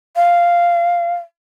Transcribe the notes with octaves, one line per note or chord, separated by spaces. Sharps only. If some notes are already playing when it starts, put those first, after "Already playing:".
F5